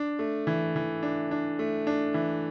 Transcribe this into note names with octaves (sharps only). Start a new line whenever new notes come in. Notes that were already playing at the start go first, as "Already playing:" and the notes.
Already playing: D4
A3
E3
E3
D4
D4
A3
D4
E3